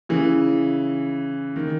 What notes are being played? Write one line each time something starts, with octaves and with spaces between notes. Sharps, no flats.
C#3 E3
D#3